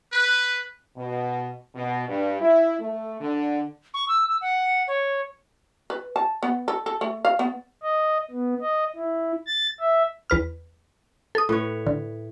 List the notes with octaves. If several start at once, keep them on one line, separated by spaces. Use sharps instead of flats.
B4
B2
B2
G2
E4
A3
D3
C#6
E6
E6
F#5
C#5
B4
A5
B3
A4
A4
A3
F5
B3
D#5
B3
D#5
E4
A6
E5
E2 B4 F6
A4 D#6
A2 B4 C#5
D3